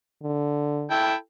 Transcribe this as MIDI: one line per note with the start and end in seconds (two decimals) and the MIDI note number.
0.23 0.89 50
0.91 1.14 64
0.91 1.14 69
0.91 1.14 79